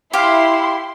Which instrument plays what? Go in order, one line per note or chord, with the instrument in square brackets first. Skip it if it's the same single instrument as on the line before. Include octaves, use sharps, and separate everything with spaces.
[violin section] E4 C6 [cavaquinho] G4 F5